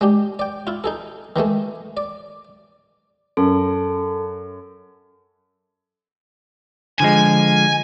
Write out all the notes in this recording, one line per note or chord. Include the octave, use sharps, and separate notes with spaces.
G#3 D4 G4
D5 G5
E4 F4
D#4 G#4 A4
D#3 E3 G#3 A3
D5
F#2 A4
D3 F3 G#3 G#5